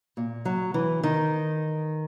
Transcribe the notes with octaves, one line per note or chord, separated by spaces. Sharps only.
A#2
F#3
E3
D#3